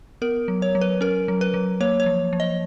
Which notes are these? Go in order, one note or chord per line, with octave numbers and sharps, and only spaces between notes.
B3 A#4
F#3
C#5
F#3
B4
C#4 A#4
F#3
B4
F#3
A#3 C#5
C#5
F3
F3
D#5